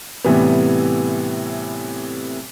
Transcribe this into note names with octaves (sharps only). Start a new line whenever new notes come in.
A2 C3 E3 G3 B3